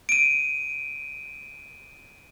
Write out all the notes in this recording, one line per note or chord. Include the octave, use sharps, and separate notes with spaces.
D7 D#7